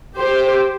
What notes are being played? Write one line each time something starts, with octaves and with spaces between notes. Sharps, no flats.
G4 C5